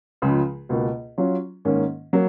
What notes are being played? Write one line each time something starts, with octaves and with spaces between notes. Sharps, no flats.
C#2 C#3 F3 G#3
C#2 B2 A#3
F#3 C#4 F4
G#2 D#3 A#3 C#4
F#3 A#3